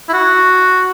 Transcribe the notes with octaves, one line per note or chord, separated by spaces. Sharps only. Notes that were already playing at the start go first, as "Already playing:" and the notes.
E4
F#4